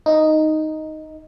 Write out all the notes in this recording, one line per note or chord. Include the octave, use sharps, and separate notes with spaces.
D#4